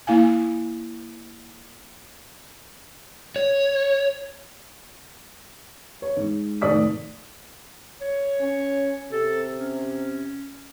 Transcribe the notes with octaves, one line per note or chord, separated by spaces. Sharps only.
A#3 E4 F5 G#5
C#5
C#5
G#2
F1 A2 D#3 D5 D#6 B6
C#5
C#4
C3 A4
C#4